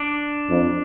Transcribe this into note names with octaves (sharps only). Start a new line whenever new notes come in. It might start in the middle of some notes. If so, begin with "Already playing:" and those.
Already playing: D4
F2